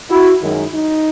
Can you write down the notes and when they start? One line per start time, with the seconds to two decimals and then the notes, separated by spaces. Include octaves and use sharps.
0.10 E4 F#4
0.41 F#2 D#3 G#3
0.73 D#4